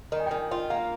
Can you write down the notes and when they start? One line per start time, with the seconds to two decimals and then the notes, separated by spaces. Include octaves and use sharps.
0.12 D#3 A#5
0.20 G#5
0.26 G5
0.31 D#3 G#5
0.51 F4
0.70 A#3 F5